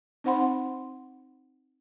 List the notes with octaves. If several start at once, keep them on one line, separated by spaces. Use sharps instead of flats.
C4 D#4 C5 F#5 B5 C6